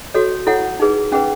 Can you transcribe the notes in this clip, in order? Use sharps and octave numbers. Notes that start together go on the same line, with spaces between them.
F#4 A4 C#5
E4 A4 C#5 F#5
D#4 G#4 B4
C#4 G#4 B4 F#5